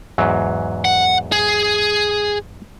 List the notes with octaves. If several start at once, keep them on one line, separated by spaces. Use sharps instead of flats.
E2 G#2 F#3
F#5
G#4